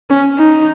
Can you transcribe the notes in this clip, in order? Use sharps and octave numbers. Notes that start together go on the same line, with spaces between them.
C#4
D#4